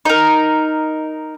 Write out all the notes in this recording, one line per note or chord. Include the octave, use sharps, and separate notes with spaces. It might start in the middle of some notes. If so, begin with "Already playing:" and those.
D#4 A#4